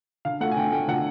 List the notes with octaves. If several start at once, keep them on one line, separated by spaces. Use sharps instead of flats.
D3 F5
A3 F#5
G#5
D3 G5
A3 G5
D3 F#5